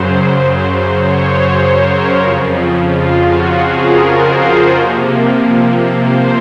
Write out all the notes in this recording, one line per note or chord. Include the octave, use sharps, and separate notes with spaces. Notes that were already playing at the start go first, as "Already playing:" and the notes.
Already playing: F#2 C#3 F#3 C5
C#5
C5
C5
A#4
F2 C#3 F3 F4
F4
F#4
G#4
A#4
C5
C5
C3 F3 A#3
C5